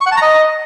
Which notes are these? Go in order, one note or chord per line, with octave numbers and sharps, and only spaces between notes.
C#6
F#5
A5
A#5
D#5